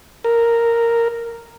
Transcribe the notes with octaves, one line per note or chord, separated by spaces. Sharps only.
A#4